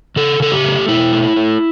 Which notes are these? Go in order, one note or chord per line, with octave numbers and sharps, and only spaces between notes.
C#3 A4
C#3 A4
G4
A3
B2 E4
A3
A3